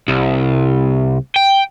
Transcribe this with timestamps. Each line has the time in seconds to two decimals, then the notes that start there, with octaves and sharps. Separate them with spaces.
0.08 C2
1.36 G5